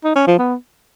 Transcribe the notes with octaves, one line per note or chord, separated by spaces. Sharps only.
D#4
C#4
F3
B3